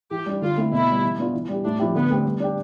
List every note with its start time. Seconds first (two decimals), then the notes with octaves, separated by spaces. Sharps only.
0.11 E3 G4
0.26 G3 D4
0.42 D3 F4
0.57 A3 C4 E4
0.72 B2 E4
0.87 G3 B3
1.03 E3
1.18 B3 D4 F4
1.33 E3
1.49 G3 D4 G4
1.64 A2 D4
1.79 F3 C4 E4 G4
1.95 D3 B3
2.10 A3 C4 G4
2.25 G3
2.40 D4 G4